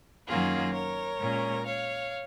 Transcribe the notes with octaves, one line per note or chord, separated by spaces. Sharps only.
F#2 D#3 F#3 A#3 C#4 F4 G#4
A#4 C#5
A#2 G#3 C#4
C#5 F5